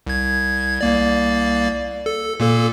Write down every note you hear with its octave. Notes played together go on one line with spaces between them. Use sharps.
C2 G#6
C2 A#3 D5
A4
A#2 A#3 A4